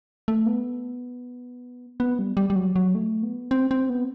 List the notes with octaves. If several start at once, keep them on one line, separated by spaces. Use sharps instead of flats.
A3
B3
B3
G3
G3
G3
F#3
F#3
A3
B3
C4
C4
B3